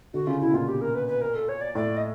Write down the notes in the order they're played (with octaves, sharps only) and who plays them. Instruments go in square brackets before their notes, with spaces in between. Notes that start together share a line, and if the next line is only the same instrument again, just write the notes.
[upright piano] D3 [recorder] F#4
[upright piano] C#3 [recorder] F4
[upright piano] B2 [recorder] E4
[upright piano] A#2 [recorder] F4
[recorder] G4
A#4
B4
B4
A#4
A4
C#5
D5
[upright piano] A2 [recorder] D5
[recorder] D#5